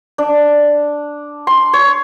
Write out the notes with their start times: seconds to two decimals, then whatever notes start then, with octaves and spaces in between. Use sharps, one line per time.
0.18 D4
1.47 C6
1.73 C#5